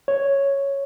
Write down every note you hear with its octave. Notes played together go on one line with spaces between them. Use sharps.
C#5